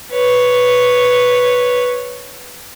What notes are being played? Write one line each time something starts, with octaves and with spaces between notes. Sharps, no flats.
B4 C#5